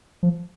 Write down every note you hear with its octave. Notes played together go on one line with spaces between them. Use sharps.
F3